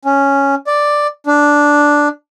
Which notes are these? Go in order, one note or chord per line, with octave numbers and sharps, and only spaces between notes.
C#4
D5
D4